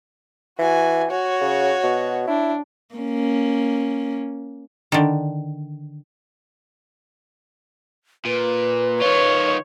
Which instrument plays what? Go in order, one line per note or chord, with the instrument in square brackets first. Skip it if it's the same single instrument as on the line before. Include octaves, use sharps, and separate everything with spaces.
[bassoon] E3 [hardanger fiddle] F#4 G#5
[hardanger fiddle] F#4 C#5
[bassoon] C#3
B2
[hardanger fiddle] D4 [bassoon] E4
[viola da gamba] A#3 C#4
[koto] D3 D#3
[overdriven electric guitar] A#2 [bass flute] B4
[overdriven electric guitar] D#3 F4 [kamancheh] C#5